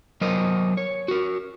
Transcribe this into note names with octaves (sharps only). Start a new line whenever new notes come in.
F#3 A#4 C5 D#5
C#5
F#4 A#4